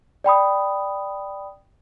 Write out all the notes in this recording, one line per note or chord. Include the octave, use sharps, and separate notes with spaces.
D5 G5 B5 D#6